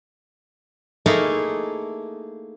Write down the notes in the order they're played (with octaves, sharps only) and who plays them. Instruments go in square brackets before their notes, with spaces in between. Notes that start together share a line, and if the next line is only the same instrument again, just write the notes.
[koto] A3 A#3 D#4 E4 G#4 A4